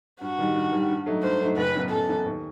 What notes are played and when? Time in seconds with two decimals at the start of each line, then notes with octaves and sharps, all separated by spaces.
0.21 G2 F#4
0.38 D#3 G3
0.55 G2
0.72 D#3 G3
0.89 G2
1.06 F#3 A3 D#4
1.23 G2 C5
1.40 F#3 A3 D#4
1.57 F#1 B4
1.74 F#2 E3 B3
1.91 F#1 A4
2.08 F#2 E3 B3
2.26 D#2